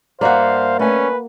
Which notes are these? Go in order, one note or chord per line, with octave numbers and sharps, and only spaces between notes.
G2 A#3 F#4 C5 D5 E5 F5
A3 C#4 B4 G#5